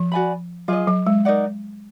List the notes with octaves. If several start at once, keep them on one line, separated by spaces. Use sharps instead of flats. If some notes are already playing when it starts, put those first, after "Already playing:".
Already playing: F3
F#4 D5 G#5 B5
F#3 F4 G#4 D#5
F#3
G#3
D#4 A#4 D5 F#5